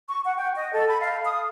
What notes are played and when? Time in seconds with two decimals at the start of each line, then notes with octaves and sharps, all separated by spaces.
0.08 C#6
0.24 F#5
0.38 G5
0.55 D#5
0.72 A4
0.89 B5
1.02 F5
1.24 D#6